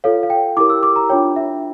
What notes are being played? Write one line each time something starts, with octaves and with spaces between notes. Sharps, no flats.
F4 A4 C#5 F5
F5
G5
E4 G4 A#4 D6
E6
D6
A#5
D4 F4 C#5 G5
E5